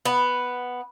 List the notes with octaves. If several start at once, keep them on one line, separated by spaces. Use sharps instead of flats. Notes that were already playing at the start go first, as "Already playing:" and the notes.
B3